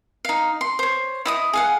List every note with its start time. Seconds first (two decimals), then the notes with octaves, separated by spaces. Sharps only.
0.25 D#4 F5
0.61 C6
0.79 C5 C#5
1.25 E4 D#5 D#6
1.53 G#4 F5 F#5